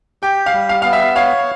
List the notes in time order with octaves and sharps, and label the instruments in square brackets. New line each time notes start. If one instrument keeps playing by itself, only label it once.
[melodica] G4 [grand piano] G5
[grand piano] F5
[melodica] G3
[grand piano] F5
[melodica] B3 [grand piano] F5
[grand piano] E5
[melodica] C#5 [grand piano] F5